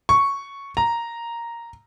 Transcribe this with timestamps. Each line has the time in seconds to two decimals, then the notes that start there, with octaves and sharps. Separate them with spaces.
0.09 C#6
0.77 A#5